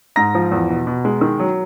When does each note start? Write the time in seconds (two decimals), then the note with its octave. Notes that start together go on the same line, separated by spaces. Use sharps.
0.16 G#2 A#5 A#6
0.35 F3
0.52 E2
0.70 B2
0.87 B2
1.05 G#3
1.21 D#3
1.39 F#3